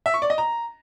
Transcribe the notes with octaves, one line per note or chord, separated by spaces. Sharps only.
E5
C#6
D5
D#5
A#5